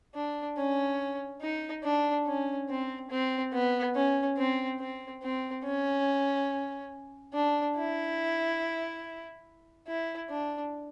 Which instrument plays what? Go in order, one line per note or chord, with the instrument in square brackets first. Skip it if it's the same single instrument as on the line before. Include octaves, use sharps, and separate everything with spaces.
[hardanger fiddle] D4
C#4
D#4
D4
C#4
C4
C4
B3
C#4
C4
C4
C4
C#4
D4
E4
E4
D4